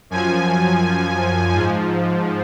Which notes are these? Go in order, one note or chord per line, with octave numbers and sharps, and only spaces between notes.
F#2 F3 G#5
G#2 F3